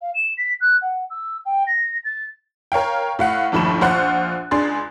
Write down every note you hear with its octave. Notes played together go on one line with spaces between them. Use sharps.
F5
E7
B6
F#6
F#5
E6
G5
A#6
A6
A#4 C#5 F5 G5
A2 F5 F#5
G1 D#2 A2 F3 B5 E7
A#1 F4 C5 F#5 C#6 F#6
C#2 D4 G#4 C6 A6